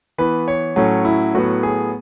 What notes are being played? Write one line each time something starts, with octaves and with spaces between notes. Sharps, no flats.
E3 B3 B4
C#5
A2 F#3 A3 C#4
E4
A2 F#3 B3 F#4
G#4